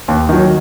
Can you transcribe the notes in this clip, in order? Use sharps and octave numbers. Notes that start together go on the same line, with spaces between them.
D#2
D#3 F#3